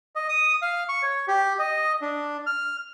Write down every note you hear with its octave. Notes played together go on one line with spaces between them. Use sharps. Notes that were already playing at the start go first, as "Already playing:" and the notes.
D#5
D#6
F5
C#6
C#5
G4
D#5
D4
F6